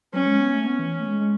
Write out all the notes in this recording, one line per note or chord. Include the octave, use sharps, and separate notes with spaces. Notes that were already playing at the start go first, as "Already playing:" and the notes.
F#3 C#4
G#3
B3
A3
B3 C#4
E3
A3
G#3
G#3